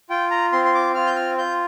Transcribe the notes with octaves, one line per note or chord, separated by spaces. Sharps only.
F4 G5
A#5
C4 C6
C6
D6
F4 F6
G6
F6
F4 G6